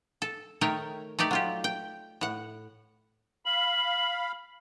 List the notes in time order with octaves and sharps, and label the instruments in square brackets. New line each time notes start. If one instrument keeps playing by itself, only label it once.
[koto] A4
D#3 A3 A#4 C#5 G5
A3 D#4 G4 D5
F#3 F4 G4
G5
A2 F#5
[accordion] F5 B5 [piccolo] F#7